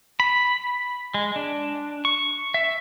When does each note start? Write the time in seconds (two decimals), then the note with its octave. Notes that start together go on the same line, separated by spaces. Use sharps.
0.20 B5
1.14 G#3
1.36 D4
2.05 C#6
2.54 E5